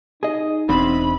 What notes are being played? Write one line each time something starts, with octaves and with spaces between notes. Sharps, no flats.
D#4 G#4 D#5
E1 E2 C4 D4 C5 B5